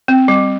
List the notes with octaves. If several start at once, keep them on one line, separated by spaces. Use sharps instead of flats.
C4
G3